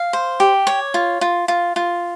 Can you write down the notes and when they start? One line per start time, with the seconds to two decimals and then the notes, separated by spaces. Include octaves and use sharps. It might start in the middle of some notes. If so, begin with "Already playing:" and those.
Already playing: F5
0.13 C5
0.40 G4
0.67 C#5
0.94 F4
1.21 F4
1.48 F4
1.76 F4